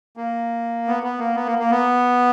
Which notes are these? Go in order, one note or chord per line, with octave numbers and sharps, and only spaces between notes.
A#3
B3
B3
A#3
B3
A#3
A#3
B3